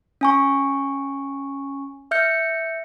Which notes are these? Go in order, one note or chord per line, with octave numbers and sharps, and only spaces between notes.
C#4 G#5 C#6
E5 F6 G6 C#7